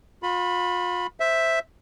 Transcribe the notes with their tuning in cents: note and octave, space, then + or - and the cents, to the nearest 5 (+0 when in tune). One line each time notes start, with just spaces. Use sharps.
F4 +40 B5 +0
C5 +0 E5 +0